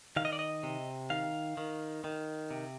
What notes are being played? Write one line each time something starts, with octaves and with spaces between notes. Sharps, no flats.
D#3 F5
D#5
D5
D#5
C3
D#3 F5
D#3
D#3
C3